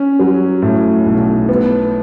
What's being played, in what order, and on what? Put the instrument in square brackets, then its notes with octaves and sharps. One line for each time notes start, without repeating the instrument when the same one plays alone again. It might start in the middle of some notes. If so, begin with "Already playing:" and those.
Already playing: [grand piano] C#4
F#3
A2
B1
B3